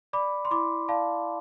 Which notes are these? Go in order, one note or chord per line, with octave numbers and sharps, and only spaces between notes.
D5 B5 D6
C6
E4 B5 D6
D5 F5 A5